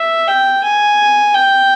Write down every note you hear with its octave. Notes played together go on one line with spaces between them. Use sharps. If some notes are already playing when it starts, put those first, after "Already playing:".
Already playing: E5
G5
G#5
G5